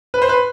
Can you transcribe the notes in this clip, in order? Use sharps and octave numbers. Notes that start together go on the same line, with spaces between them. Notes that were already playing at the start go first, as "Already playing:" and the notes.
B4
C5
B4